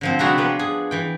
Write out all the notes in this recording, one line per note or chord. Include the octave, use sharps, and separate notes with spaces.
D3 F3 C4
C3 G3 D4 F#4 G#4 A#5
F3 B3 B4
G#4
E3 G5